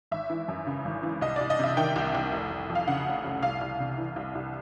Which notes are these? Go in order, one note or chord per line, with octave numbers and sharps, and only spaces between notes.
G#1 E5
E3
F#2
C#3
G#1
E3
C2 D#5
C2 D5
D#5
C3 E5
D#3 G5
C2
C2
F1
F1
F2
F5
C#3 F#5
F1
F1
C2 F5
C2
C3
E3
C2
C2